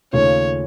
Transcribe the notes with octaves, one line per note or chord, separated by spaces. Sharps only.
D#2 C#3 A3 C#4 F4 C#5